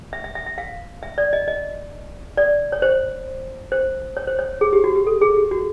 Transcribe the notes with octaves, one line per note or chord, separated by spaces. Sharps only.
E5
E5
E5
E5
F5
E5
D5
D#5
D#5
D5
C#5
C5
C5
C#5
C5
C#5
G#4
G4
F#4
G4
A4
G#4
G4
F#4